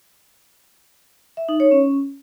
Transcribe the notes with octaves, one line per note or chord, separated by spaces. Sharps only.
E5
D#4
C#5
C#4